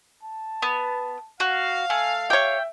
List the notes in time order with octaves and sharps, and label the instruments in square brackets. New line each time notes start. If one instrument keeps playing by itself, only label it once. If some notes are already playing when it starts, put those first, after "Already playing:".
[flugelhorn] A5
[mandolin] B3
[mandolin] F#4 [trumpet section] F5
[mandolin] A3 [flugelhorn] G#5
[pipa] G4 C#5 [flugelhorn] E5 [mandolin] G5